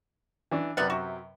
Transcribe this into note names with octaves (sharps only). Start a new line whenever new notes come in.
E3 D4
F#2 C3 B3 D5 F#5
F#4